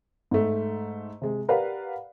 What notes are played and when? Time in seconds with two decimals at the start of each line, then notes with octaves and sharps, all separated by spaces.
0.31 G#2 A3
1.22 C3 G#3
1.48 G4 A#4 B4 D5 F5 F#5